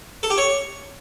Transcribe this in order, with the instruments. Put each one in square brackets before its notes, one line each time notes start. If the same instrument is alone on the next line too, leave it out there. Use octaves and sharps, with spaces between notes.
[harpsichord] A4
G4
C#5